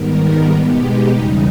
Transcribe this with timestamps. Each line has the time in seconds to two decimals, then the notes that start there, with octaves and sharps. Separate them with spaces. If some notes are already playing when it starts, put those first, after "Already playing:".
Already playing: G#2 D#3 G3 B3 A#4
0.50 B2 G#3 B3 G4
0.80 D#4
1.09 E2 C#3 E3 G3